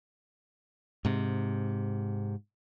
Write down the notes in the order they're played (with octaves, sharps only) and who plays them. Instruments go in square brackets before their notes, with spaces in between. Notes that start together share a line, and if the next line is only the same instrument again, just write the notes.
[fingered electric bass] G#2 C3